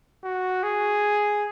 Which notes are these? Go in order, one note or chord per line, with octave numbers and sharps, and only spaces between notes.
F#4
G#4